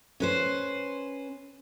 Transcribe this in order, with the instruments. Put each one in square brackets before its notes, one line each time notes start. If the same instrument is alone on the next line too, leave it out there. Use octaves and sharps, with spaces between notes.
[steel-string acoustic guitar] C#4 B4 C5